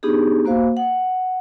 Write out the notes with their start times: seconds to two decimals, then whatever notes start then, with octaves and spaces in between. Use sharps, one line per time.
0.03 B3 D4 D#4 G4 G#4
0.46 A#3 F#4 C5 F5
0.77 F#5